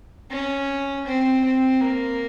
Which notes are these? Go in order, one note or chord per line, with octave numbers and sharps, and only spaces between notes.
C#4
C4
C4
A#3